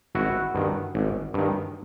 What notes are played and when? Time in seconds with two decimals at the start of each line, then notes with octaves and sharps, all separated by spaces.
0.15 G#1 E4 F#4
0.55 G2 D#3
0.95 G#1
1.34 G2 D#3